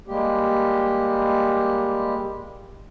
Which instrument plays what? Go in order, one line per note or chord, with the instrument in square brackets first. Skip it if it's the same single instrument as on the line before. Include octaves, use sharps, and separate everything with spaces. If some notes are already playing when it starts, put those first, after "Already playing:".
[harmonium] G3 G#3 A#3 G4